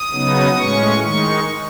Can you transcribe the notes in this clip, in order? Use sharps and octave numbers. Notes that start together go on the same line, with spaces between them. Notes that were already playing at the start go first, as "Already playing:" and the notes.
Already playing: D#6
C#3 F#3 B3 D#4
A2 G#3 C#4 C#6
D#3 G#3 D#4 C#6